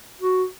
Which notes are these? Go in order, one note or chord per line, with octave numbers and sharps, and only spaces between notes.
F#4